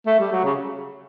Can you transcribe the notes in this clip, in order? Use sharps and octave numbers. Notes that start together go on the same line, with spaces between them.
A3
G3
F#3
C#3